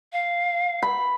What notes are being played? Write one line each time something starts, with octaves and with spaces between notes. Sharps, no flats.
F5
B5